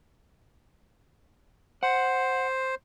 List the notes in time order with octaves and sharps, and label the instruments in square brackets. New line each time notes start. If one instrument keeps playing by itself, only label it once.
[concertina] C5 [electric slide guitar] F#5